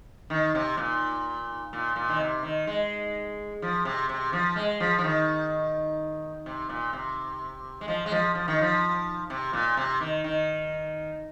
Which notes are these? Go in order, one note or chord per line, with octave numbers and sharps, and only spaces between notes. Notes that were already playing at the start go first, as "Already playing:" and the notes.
D#3
C3
A#2
A#2
A#2
D#3
C3
D#3
G#3
F3
C3
C3
F3
G#3
F3
F3
D#3
C3
A#2
C3
G#3
F3
G#3
F3
F3
D#3
F3
C3
A#2
C3
D#3
D#3